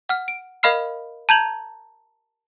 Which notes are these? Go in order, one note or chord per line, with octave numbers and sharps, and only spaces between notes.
F#5 F6
D7
A#4 D#5 F5 B5 F6 C7
A5 A#5 G6 G#6 F7 F#7